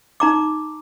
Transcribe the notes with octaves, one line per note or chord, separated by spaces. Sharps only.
D#4 A#5 D6